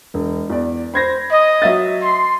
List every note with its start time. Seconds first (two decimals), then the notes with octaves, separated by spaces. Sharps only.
0.14 E1
0.50 E2 D5
0.94 C5 B5 G#6 A#6
1.30 D#5
1.62 F#3 E5 A6
2.01 C6